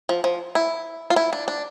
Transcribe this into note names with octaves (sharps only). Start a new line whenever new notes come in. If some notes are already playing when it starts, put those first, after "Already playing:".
F3
F3
E4
F4
E4
D4
D4